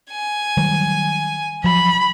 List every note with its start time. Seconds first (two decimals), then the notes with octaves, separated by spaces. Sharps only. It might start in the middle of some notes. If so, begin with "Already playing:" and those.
0.11 G#5
0.57 D#3 F#3 G3
1.64 F3 F#3 B5